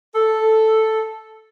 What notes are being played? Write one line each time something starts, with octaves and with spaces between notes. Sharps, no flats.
A4